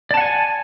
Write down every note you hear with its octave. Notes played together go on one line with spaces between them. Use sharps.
D5 F#5 G#5 A5